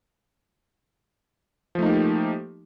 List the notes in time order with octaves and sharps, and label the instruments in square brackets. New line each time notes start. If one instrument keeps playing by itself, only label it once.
[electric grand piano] F3
A3
D#4
A#3
G4